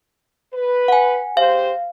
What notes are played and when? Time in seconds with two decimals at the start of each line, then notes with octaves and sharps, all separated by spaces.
0.53 B4
0.88 F#5 G#5
1.37 G#2 G4 C5 F5